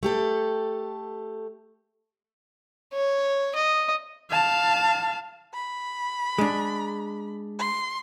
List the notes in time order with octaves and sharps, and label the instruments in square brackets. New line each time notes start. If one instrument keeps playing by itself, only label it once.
[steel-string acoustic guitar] A3 G4 A4
[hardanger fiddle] C#5
D#5
[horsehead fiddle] F5 A5
[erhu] B5
[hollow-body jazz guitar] G#3 D4
[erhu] C6